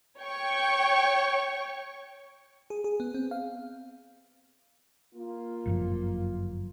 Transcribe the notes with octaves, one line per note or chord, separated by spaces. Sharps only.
C#5 G5 C#6
G#4
G#4
B3
C4
F5
A#3 F4
G1 F#2 F3